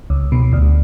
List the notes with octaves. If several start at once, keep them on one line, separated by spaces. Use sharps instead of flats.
C#2
B2
D2